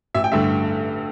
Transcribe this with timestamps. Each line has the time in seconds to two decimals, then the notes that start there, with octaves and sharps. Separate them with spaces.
0.15 A1 E5
0.24 G5
0.32 G2 D3 A3 E5